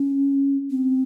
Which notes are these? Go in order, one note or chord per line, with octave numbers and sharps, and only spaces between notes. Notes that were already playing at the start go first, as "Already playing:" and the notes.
Already playing: C#4
C4